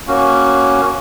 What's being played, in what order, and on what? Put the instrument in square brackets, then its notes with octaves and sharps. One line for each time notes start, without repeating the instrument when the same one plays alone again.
[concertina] A#3 C#4 F#4